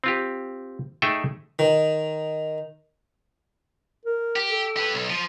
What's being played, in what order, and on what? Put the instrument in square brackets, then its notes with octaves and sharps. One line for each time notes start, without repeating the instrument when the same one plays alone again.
[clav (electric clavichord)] C4 F4 G4
A3 D#4 G#4 A4 E5 G5
[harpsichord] D#3
[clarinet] A#4
[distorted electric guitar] G4
[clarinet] A4
[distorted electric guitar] G4 B4
B1
F3